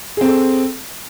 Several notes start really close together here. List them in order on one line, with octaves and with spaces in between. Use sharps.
G#4 C4 A4